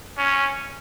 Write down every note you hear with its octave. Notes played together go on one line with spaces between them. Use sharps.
C#4